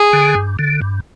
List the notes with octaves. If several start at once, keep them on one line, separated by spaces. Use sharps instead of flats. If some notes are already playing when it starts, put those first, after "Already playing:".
Already playing: G#4
D3
G2
D3
G2